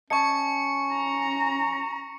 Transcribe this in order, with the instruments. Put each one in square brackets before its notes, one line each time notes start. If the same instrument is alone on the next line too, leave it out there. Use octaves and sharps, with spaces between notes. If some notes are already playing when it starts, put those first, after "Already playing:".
[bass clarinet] C#4 [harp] D#5 G#5 A5 [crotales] C#6 C#7
[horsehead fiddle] A#5